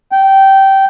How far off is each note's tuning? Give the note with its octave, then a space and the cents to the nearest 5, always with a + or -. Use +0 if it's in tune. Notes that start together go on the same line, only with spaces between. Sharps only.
G5 -15